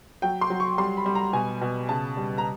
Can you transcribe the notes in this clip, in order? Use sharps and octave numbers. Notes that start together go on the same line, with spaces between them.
F#3 G5
C6
F#3
C#6
G3 C6
B5
G3
A#5
B2 G#5
B2
C#3 A5
G3
A#5